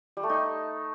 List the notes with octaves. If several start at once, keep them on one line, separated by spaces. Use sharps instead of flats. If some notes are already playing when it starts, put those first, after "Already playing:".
G3
A3
D#4